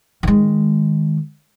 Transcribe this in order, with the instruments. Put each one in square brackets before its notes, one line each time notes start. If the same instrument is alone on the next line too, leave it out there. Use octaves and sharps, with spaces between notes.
[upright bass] D#3 G#3